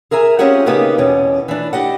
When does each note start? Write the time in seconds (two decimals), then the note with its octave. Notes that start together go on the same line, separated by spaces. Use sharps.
0.11 G#4 A#4 E5 G#5 A#5
0.39 C4 C#4 F4 G4 G#4 F#5
0.66 C#3 A#3 B3 D#4 G4 G#4
0.98 E2 B2 C#4
1.48 E3 D4
1.73 G4 D#5 F#5